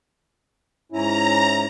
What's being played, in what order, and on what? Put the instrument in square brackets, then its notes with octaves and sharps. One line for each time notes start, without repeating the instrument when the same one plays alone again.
[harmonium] G#2 C#4 E4 [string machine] A#5